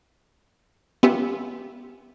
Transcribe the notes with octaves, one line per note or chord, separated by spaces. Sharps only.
B3 C#4 F4 G4 E5